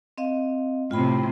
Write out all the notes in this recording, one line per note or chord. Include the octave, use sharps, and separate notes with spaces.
C4 D#5 F5
A2 C3 F4 G5 B5